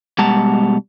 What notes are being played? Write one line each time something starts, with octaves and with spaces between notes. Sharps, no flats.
B2 G3 G#3 F#5 A5 A#5